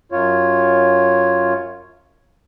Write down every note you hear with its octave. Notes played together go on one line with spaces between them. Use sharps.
F#2 F4 C#5